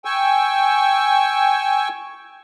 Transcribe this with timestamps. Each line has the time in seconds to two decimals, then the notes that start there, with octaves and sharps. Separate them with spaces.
0.05 G5 G#5 C#6 E6